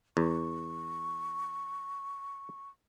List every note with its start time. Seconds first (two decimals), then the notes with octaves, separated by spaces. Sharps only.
0.17 E2 C#6